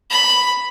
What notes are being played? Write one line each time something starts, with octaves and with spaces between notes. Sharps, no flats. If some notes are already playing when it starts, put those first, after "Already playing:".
B5